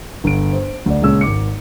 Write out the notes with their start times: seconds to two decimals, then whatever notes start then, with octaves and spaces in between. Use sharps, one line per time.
0.24 G1 D7
0.53 C5
0.86 D2 D5
1.02 C#2 A#2 G#3 C#4 E6
1.21 G#1 D6 C#7